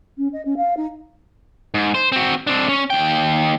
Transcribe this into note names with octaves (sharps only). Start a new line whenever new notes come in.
C#4
D#5
C#4
F5
D#4
G#2
C5
C4 F#4
C4 D4
C#4
D#2 G5